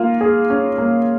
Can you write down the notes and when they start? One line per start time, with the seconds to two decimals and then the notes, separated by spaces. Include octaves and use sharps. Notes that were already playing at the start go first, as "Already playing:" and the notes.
Already playing: A#3 F4
0.21 G#4
0.50 C#4
0.78 A#3